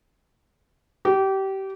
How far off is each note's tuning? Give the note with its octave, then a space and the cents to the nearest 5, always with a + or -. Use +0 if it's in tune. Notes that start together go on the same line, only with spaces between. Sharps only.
G4 -25